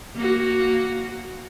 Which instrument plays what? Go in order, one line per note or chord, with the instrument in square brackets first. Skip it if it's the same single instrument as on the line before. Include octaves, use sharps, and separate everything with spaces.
[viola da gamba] A#3 F#4